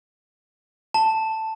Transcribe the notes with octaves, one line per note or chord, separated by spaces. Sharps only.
A5